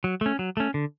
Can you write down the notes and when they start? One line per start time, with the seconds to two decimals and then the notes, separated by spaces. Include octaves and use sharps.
0.04 F#3
0.21 A3 C#4
0.39 F#3
0.57 A3 C#4
0.74 D3